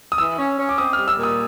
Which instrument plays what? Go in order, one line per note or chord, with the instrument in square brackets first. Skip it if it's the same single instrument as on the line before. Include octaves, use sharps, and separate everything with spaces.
[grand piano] D#6
[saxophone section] E3 [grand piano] E6
[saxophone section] C#4
C#4
[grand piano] D6
[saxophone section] C4 [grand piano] D#6
[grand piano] F6
[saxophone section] G3
[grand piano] E6
[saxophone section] A#2
[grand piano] D#6